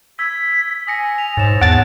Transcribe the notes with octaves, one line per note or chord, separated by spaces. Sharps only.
E6 G#6 B6
G#5 D#6 A#6 C#7
F7
G#2 C#5 A6 E7
E2 F#5 A5 A6 D7